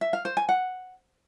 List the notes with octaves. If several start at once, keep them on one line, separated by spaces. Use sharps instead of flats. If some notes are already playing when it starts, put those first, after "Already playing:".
E5
F5
C5
G#5
F#5